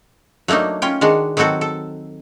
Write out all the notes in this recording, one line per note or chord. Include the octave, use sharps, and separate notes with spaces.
F#3 A3 A#3 D4 D#4
C#4 F4 G5
D#3 G#3 D4 F#4
D#3 F#3 C4 F#4 A4
A4